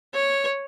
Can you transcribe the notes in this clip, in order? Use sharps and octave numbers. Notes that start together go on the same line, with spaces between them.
C#5